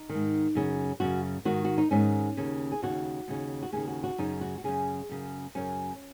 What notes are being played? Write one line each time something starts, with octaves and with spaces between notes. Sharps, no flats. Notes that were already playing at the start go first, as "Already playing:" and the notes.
Already playing: D#4
G#2 D#3
F#2 C#3
F#2 C#3 F#4
G#2 D#3 F#4
F#4
D#4
G#2 D#3 C#4
D#2 C#3
G#4
D#2 C#3 F#4
D#2 C#3
F#4
D#2 C#3 G#4
F#4
F#4
F#2 C#3 D#4
F#4
F#4
F#2 C#3 G#4
F#2 C#3
F#2 C#3 C#4